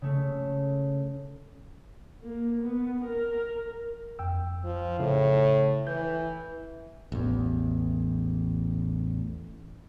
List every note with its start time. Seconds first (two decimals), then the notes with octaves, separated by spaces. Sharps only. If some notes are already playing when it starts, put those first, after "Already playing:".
0.01 C#3 A3
2.23 A#3
2.62 B3
3.04 A#4
4.19 F2 G5 E6
4.64 F3
4.99 A2 C#3
5.87 E3 G6
7.12 A1 E2